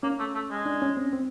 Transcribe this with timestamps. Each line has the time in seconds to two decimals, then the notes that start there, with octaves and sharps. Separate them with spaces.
0.03 A#3 C#4
0.19 A3
0.35 A3
0.50 G#3
0.66 D4
0.82 C#4
0.97 C4
1.13 C4